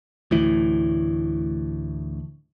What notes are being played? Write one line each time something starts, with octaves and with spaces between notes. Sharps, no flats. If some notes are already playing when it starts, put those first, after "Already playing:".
D2 A2 E3